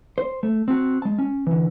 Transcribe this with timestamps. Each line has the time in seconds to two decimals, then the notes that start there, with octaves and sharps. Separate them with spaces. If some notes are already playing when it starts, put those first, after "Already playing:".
0.18 C5
0.43 A3
0.68 C4 F#4
1.02 G#3 A5
1.18 C#4
1.47 D3 E3